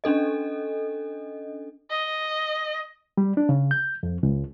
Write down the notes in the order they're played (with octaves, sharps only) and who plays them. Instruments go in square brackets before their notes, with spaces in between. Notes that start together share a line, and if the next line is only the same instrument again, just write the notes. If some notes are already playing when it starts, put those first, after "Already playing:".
[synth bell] C#4 D4 A4 D#5
[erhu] D#5
[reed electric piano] G3
D4
C#3
G6
F2
C#2